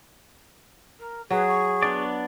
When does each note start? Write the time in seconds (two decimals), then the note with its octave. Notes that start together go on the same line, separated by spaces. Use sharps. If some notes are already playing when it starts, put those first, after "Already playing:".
0.99 A#4
1.30 F#3 G#4 B4
1.48 C#6
1.83 B3 D4 D5